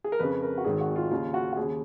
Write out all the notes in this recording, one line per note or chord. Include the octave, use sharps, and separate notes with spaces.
G#4
A#4
F2 C#3 B4
A#4
F#4
G#1 G#2 D#3 G#4
F#4
F4
D#2 C#3 F4
F#4
F#4
D#2 G#4
C#3